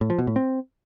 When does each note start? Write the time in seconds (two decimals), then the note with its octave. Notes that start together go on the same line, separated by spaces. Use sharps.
0.01 A2
0.10 F3
0.19 B2
0.27 A2
0.36 C4